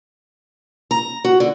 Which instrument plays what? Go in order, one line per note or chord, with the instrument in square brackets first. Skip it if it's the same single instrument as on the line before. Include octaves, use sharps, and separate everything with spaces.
[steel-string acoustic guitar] A#5
F#4
D3